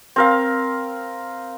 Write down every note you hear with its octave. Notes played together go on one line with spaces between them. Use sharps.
C4 A#4 F5